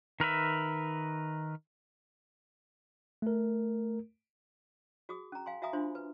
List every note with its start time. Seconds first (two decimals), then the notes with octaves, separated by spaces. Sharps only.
0.20 D#3 A#4 B4 E5
3.22 A3 A#4
5.09 F#4 G#4 D#6
5.32 C#4 A#5
5.46 F5 G#5 C6
5.62 F#4 E5 F5 G#5 A#5 D#6
5.73 D4 F4 C5 C6
5.95 B4